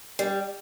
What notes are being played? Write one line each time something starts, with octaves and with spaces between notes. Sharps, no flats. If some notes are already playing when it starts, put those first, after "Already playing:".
G3